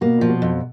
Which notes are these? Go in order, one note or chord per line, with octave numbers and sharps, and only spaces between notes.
B2 A#3
A#2 F3
B2
F2